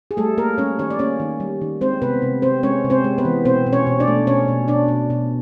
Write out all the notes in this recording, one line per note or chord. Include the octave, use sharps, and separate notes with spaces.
G#4
G3 A3 A4
A#3 A#4
G3 C#4 C#5
D#3 C#4 C#5
D5
A#3 C#4 C#5
D#3
G3
D#3
G#3 C4 C5
C3 B3 B4
C3
C3 C4 C5
G#3 C#4 C#5
C3
C4 C5
G#3
B3 B4
E3
B2 C4 C5
B2
C#4 C#5
B2
D4 D5
A3
B2 C#4 C#5
B2
B2 D4 D5
B2
B2